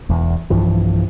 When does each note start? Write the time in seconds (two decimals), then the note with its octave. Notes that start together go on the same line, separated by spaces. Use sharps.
0.09 E1 E2
0.50 B1 G2 E3 F3